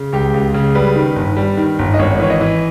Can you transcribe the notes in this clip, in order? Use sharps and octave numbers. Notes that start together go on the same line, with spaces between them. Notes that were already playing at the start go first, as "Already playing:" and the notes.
Already playing: C#3
C#2 G4
C#2
C#3
G3 B4
D#3
G1
G3
D#3
G1
D#5
G#1 C#5
E3 C#5
D#5
E3